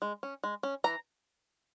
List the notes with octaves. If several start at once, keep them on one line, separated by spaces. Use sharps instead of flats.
G#3
C#4
G#3
C#4
E3 A#5